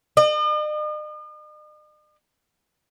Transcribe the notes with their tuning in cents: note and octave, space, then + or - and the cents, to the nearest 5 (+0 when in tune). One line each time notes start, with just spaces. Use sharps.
D#5 -45